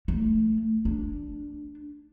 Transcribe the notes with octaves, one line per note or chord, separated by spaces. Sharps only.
A3
D4